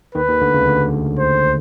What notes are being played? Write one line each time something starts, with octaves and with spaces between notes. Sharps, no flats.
D#2 D#3 B4
D#2 D#3
D2 D3
C#2 C#3
D2 D3
C5